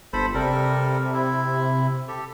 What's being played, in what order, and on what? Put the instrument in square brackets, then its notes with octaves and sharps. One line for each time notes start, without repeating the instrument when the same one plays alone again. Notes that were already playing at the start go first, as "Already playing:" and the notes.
[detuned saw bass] G1 [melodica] A4 C5 B5
[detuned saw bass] C3 [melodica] G3 A4 A#4
[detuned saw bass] C3
[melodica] E4
G4 A4